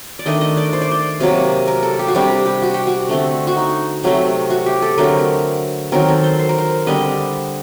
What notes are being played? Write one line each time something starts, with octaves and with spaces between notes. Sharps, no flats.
D5
D#3 A3 D4 D#5
D#5
D5
C5
D5
C5
C3 F#3 A#3
A#4
A4
G4
F#4
C3 G3 D4 G4
G4
F#4
G4
F#4
D3 A3 C4
F#4
D#4
C3 F#3 A3 C4
F#4
G4
A4
D3 F#3 A3 C4 A#4
D#3 F#3 C4 A#4
A4
C5
C5
A#4
C5
D3 G3 C4 D#5